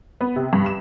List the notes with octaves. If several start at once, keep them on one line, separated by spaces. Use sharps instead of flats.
B3
C3
G2
E7